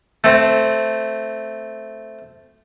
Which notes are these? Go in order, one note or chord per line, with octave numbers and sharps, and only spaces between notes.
A3 C4